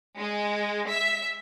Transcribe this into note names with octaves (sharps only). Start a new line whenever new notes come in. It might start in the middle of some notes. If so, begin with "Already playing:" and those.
G#3
E5